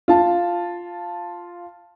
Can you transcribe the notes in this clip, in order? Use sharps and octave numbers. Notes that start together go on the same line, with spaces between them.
F4 A5